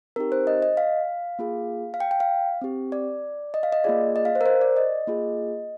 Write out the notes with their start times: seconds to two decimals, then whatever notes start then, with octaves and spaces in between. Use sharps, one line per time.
0.16 C4 D#4 G4 A#4
0.32 C5
0.47 D#5
0.62 D#5
0.77 F5
1.39 A#3 F4 G#4
1.94 F5
2.00 G5
2.11 G5
2.20 F5
2.62 C4 G4
2.92 D5
3.54 D#5
3.63 F5
3.72 D#5
3.84 A#3 F4 G#4 D5
4.16 D#5
4.25 F5
4.35 C5
4.41 A#4
4.46 C5
4.61 D5
4.77 D#5
5.07 A#3 F4 G#4